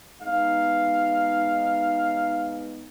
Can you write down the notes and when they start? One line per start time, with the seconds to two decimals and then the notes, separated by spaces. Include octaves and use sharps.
0.23 G#3 B3 D#4 F5